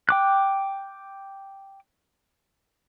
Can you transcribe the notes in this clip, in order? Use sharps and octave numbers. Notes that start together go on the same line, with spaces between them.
G5 D6 F#6